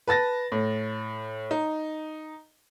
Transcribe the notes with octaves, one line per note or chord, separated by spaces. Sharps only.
B4 A5 A6 A#6
A2
D#4